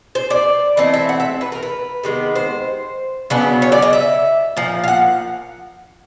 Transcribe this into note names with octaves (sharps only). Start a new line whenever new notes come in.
C5
D5
E3 A3 C4 D#5
E5
F#5
E5
B4
A#4
B4
C3 D#3 G#3 B3
C5
C#3 F#3 B3 D4
C#5
D5
D#5
E5
A#2 F3
F5
F#5